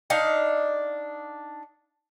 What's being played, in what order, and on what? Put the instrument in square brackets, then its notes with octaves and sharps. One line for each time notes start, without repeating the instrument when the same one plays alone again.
[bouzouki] D4 D#4 F5